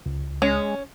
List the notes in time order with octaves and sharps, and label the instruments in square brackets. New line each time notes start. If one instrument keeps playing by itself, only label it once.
[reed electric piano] C#2
[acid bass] G#3 [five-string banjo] C#4